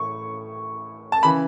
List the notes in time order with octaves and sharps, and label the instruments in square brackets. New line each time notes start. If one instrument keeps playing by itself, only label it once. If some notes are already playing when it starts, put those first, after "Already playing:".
Already playing: [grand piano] A1 A2 E3 C#6
A5
C#3 E3 B5